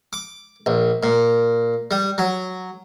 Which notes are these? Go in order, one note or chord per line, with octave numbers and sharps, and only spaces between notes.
D6
A#1
A#2
G3
F#3